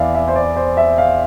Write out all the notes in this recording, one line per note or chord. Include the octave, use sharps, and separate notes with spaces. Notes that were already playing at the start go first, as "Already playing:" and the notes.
Already playing: E2 D5 E5 F5
E5
C5
D5
C5
E5
F5